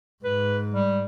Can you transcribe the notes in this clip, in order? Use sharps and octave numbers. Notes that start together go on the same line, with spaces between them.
G#2 B4
G3